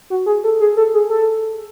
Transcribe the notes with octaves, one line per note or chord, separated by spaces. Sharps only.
F#4
G#4
A4
G#4
A4
G#4
A4